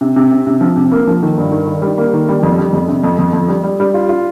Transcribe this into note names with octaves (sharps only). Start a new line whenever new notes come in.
C3
C3
C3
C3
F3
C3
A#3
F3
D#3
G2
D#3
D#3
G3
A#3
D#3
G3
F2
G3
F2
C3
F2
F2
F2
G3
G3
G3
F4
F4